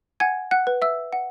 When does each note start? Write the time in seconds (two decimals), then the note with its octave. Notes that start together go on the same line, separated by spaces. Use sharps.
0.20 F#5 G#5 G#6
0.51 F#5 F#6
0.67 B4
0.82 E5 E6
1.13 F#5